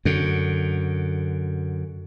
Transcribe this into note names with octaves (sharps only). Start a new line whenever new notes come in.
F#2 D3